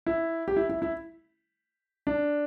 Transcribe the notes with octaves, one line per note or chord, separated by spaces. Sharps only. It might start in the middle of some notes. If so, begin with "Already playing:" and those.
E4
G4
E4
E4
E4
D4